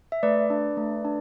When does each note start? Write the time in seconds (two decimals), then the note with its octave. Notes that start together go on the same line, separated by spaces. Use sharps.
0.12 E5
0.23 A3 B4 D5
0.50 D4
0.77 A3
1.05 D4